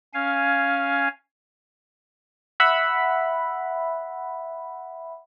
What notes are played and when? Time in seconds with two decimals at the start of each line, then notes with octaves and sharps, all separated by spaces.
0.14 C#4 F5 G#5
2.60 E5 F#5 B5